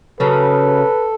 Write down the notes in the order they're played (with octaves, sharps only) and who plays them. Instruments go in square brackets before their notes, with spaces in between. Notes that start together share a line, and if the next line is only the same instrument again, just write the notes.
[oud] C#3 F#3 [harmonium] A4 [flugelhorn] B4